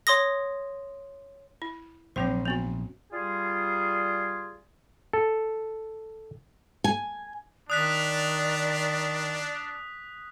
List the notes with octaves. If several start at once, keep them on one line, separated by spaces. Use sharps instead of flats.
C#5 C6 D#6 A#6
E4
A#1 G#2 F#3 C4 C5
B3 C#4 F#4
G3 F4 G#4
A4
G#5
D#3 D4 D5 D#6 F#6 B6